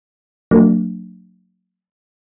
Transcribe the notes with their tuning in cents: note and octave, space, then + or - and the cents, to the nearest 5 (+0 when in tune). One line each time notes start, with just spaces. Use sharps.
F#3 -15 A#3 -45 D4 +0